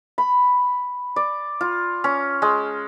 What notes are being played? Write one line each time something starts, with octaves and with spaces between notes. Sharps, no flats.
B5
D5
F4
C#4
G#3